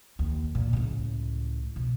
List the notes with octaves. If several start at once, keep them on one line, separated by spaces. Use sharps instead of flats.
D#2
A#2
C#2 A2
B2